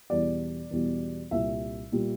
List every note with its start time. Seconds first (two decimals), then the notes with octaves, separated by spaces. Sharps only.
0.10 E2 B2 G3 D5
0.71 E2 B2 G3
1.31 C2 A#2 G3 E5
1.92 A#2 G3